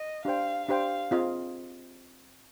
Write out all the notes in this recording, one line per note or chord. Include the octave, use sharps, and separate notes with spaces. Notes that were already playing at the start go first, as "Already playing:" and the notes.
Already playing: D#5
D4 G4 C5 F5 G5
D4 G4 C5 F5 G5
C4 F4 G#4 D#5